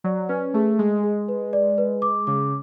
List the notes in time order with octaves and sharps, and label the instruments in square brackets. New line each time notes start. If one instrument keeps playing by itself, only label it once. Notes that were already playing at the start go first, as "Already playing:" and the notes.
[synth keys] F#3 [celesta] D5
[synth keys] C#4 [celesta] B4
[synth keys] A3 [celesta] G#4
[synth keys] G#3 [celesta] G#4
[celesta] G#4
B4
D5
B4
D6
[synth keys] C#3 [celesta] D6